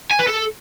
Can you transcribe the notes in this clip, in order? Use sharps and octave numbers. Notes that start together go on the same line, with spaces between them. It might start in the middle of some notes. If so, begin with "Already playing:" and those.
G#5
B4
A4